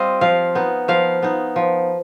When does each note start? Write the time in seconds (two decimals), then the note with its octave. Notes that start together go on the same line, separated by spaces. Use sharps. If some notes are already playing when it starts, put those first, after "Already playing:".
Already playing: G3 C4 F4 D#5
0.21 F3 F5
0.55 B3 D#4
0.88 F3 F5
1.22 B3 D#4
1.56 F3